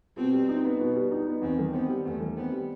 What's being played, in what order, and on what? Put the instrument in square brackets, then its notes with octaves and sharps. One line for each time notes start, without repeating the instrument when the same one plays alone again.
[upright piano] B2 [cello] C4
[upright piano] G3
D#4
B3
B2
G3
D#4
B3
[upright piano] E2 [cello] C4
[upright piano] D#3
[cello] B3 [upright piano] C4
[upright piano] G3
[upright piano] E2 [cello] A3
[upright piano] D#3
[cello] B3 [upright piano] C4
[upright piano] G3